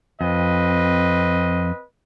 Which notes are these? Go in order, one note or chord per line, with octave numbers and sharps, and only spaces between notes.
F2 C4 B4 D#5